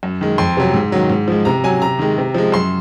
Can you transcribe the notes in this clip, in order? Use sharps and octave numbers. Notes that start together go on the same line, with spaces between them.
F#2
D#3 G#3
F2 C6
C3 F#3
G#2
D#3 F#3
G#2
F3 G#3
C3 A#5
F#3 G#5
C3 A#5
D#3 G#3
C3
F3 G#3
F#2 C6